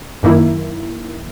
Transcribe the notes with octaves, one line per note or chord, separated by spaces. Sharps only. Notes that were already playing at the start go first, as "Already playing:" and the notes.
F#2 D#3 A#3 E4